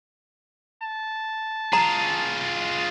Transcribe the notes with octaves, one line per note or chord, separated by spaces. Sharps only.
A5
F4 G#4 A#5